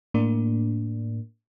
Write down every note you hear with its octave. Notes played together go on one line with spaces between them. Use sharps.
A2 A#3 D4